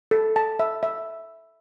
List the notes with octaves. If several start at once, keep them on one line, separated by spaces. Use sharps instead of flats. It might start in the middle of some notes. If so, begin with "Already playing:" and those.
A4
A5
E5
E5